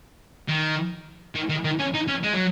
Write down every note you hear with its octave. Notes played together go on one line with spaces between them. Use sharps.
D#3
D#3
D#3
D#3
C#4
D#4
C#4
G#3
F#3